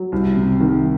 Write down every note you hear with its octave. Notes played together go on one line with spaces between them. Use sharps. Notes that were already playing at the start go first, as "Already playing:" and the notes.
Already playing: F#3
C2
C3
D#3